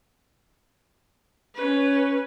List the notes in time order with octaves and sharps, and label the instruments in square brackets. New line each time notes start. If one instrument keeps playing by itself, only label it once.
[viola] C#4 B4